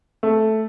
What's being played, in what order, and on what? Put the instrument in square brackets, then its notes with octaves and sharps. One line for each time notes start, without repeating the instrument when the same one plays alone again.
[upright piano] A3